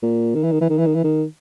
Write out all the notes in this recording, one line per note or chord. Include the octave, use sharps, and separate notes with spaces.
A#2
D#3
E3
D#3
E3
D#3
E3
D#3
E3
D#3